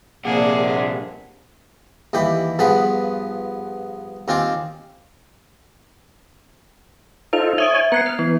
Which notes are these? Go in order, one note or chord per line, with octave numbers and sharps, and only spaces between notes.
A#1 G2 C3 A#3 D4 G#4 F#5
D#2 E3 G4 B5
G2 F3 B3 G#4 B5
D#2 C4 F4 G#5 D6
D#4 F4 A4 C5 F7
C#5 E5 G#5 D#6 D7
E5
B3 B4 F#5 A#5 G#6 C7
F6
E3 B3